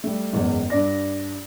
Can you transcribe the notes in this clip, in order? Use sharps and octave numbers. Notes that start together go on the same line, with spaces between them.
G3 A3
F#1 E2 G#2
G2 D4 D5 A#6